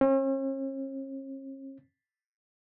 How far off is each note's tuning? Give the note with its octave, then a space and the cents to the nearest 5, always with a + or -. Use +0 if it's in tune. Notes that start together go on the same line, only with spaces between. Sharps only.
C#4 -45